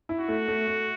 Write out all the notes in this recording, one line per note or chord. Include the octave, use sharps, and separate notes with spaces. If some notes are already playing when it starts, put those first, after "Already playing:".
E4
F#4
A3
A3
A3